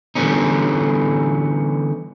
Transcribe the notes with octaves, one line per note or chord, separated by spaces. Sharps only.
D3 E3 G3 B3 C#4 D#4